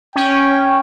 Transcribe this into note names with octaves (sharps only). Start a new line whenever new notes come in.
C#4 G5